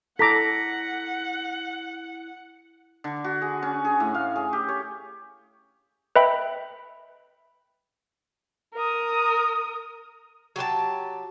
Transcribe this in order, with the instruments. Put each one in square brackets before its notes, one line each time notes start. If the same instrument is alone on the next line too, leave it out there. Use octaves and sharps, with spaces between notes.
[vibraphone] E4 [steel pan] A4 A#5 D6 [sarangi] F#5 [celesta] A#6 B6
[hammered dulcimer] D3
F#4
G#4
C#4
G#4
A2
F5
G#4
G4
C#5
[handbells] B4 D#5 E5 G5 B5
[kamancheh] A#4 D#6
[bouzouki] F#3 G4 C5 A5